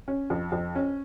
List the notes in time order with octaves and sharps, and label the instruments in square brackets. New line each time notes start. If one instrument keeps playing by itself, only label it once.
[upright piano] C#4
F2
F2
C#4